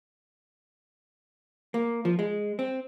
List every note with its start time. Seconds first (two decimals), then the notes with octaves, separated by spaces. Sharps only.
1.74 A#3
2.05 F3
2.19 G#3
2.59 C4